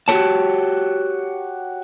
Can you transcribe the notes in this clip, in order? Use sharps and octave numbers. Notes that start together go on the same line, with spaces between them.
F#4 G4 A4 B4 C#5 A5